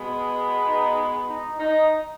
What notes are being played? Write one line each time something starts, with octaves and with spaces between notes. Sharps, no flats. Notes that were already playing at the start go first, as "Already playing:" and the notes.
Already playing: B2 G#3 B3
D#4
D#4
D#4